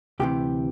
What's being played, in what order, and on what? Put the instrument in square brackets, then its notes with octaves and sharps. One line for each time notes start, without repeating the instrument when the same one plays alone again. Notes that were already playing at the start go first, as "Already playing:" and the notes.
[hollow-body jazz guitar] D2 C3 E3 G4